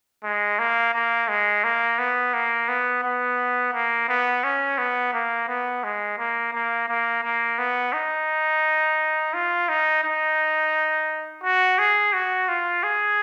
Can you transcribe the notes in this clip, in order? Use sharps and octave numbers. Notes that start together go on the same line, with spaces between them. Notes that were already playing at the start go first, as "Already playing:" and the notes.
G#3
A#3
A#3
G#3
A#3
B3
A#3
B3
B3
A#3
B3
C#4
B3
A#3
B3
G#3
A#3
A#3
A#3
A#3
B3
D#4
F4
D#4
D#4
F#4
G#4
F#4
F4
G#4